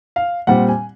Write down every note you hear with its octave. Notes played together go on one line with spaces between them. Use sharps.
F5
A#2 G3 C4 F#5
G#5